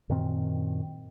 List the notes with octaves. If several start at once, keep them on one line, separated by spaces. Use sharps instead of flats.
F#2 A#2 D#3 C4